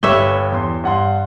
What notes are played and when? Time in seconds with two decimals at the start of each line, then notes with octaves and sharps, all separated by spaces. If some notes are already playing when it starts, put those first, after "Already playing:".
0.03 G1 G4 B4 C#5 E5 G7
0.52 E2 C6
0.83 G2 F#5 C6